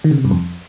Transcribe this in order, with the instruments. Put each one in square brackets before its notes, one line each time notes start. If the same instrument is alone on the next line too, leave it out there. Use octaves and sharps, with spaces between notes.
[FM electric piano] D#3
C#3
C3
G2
F2